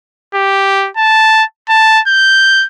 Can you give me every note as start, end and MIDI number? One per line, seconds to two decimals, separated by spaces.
0.35 0.89 67
0.97 1.43 81
1.69 2.00 81
2.08 2.65 91